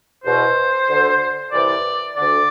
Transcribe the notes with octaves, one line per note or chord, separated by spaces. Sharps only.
E2 B2 C5
D2 D3
C2 C3 E3 D5
D2 D3 D5